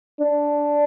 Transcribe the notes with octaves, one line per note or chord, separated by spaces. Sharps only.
D4